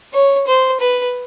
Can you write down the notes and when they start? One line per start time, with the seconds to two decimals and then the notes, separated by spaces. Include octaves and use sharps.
0.13 C#5
0.47 C5
0.80 B4